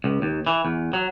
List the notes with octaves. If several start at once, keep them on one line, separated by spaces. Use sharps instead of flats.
C#2
D#2
E3
E2
F#3